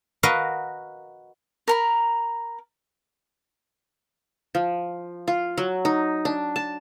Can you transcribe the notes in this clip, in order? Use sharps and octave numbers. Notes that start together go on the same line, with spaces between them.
F#4 A#4 B4 D#5 F5
A#4 A#5 B5
F3
F4
F#3
D#4
D4
A5